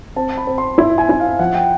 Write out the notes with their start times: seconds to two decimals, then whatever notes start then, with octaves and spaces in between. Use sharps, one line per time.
0.16 C4 A5
0.37 B5
0.47 C4
0.58 C6
0.78 E4 C6
0.98 G#5
1.09 E4
1.20 F5
1.39 F3 F#5
1.55 G5